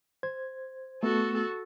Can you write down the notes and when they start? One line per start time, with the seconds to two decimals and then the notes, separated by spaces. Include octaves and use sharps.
0.23 C5 G#6
1.03 A3 B3 F#4 A4